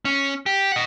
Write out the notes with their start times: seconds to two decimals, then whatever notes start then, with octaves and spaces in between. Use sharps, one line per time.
0.05 C#4
0.46 G4
0.72 D#5 F#5